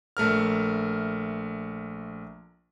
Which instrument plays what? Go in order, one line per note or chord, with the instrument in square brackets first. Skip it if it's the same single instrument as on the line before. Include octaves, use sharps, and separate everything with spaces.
[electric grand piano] A#1 A3 A#4 F6